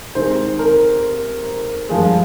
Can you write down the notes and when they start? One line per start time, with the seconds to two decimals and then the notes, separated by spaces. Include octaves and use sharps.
0.15 C3 D#3 G#3 C5
0.59 A#4
1.89 G2 F3 G#3